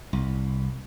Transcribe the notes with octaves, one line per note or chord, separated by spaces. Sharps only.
C2